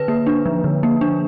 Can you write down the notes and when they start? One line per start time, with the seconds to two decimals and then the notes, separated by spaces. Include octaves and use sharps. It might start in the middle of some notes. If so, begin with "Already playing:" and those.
Already playing: D3 B4
0.08 A#3
0.27 D4
0.46 F3
0.64 D3
0.83 A#3
1.01 D4